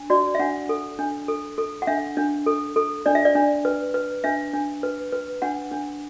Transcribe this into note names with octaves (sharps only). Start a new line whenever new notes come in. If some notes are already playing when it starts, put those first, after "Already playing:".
Already playing: D4
F#4 D5
E5
D4 F#5
A4
D4
A4
A4
F#5
D4 E5
D4
A4
A4
D4 D5
E5
D5
D4
B4
B4
D4 E5
D4
B4
B4
D4 F#5
D4